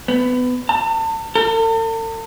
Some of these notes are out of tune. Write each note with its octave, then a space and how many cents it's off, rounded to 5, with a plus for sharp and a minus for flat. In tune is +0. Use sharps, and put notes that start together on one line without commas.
B3 +20
A5 +35
A4 +45